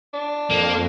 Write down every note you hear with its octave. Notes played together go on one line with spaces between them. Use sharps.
D4
F2 A#3